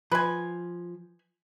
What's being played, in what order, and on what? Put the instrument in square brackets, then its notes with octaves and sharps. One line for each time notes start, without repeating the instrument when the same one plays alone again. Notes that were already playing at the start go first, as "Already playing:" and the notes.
[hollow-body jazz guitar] F3 [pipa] B4 G#5